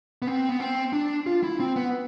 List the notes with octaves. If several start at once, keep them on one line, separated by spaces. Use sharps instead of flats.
B3
C4
B3
C4
D4
F4
E4
C4
B3